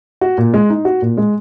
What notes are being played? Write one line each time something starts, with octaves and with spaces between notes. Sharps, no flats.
F#4
A#2
G#3
D#4
F#4
A#2
G#3